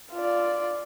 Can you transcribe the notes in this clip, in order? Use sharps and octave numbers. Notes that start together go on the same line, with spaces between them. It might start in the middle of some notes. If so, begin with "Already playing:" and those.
F4 D5